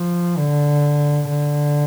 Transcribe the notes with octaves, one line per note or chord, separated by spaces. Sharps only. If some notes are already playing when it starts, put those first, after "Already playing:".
Already playing: F3
D3
D3